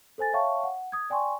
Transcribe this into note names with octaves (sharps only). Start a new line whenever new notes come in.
A4 C5 G#5 A6
C#5 E5 F5 G5 A5 C#6
F#5
D#6 G#6
D5 G5 G#5 C6 C#6